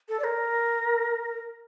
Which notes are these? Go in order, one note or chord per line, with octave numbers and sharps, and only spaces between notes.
A4
D5
A#4